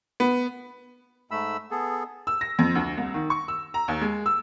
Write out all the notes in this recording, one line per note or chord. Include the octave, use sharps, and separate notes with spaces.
B3
G#2 A3 B5 E6
B3 G#4 A4
E6
A#6
F2
D2
C2
D#3
C#6
E6
A#5
D#2
G#3
E6